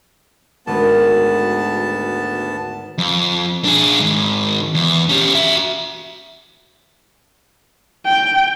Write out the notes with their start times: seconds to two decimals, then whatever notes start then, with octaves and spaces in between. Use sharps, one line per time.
0.67 G#1 D2 B3 A5
2.98 F2
3.65 D4 G#4
3.99 G#2 D#3
4.75 E2
5.09 C#4 G4
5.35 F#4 E5
8.05 G5